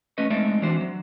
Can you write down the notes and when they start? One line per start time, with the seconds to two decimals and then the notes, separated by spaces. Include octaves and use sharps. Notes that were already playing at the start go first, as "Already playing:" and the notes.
0.18 A3 C#4 B4 D#5
0.30 G#3 A3 C4 D#4 D5 E5
0.62 E3 C4 D4 F#4 C5
0.81 F#3